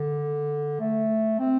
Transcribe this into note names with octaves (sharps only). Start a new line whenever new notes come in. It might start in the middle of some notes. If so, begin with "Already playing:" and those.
Already playing: D3
A3
C4